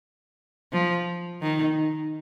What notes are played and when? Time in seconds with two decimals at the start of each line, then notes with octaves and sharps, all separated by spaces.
0.73 F3
1.42 D#3